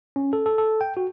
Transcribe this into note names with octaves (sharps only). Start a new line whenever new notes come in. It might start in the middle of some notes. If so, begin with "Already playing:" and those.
C#4
A4
A4
A4
G5
F#4